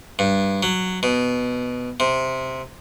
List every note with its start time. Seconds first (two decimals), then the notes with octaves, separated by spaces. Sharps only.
0.19 G2
0.63 F#3
1.03 B2
2.00 C3